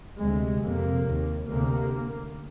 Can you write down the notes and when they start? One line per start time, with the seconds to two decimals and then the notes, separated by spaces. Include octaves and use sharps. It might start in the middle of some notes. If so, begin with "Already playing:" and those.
0.18 D2 C3 G#3
0.62 F2 C3 A#3
1.05 D#2
1.49 D2 C3 A#3